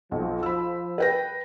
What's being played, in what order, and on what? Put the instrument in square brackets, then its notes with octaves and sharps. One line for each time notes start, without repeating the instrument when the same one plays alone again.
[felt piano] B1 [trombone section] F3
[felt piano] B5 E6
B4 G5 A#6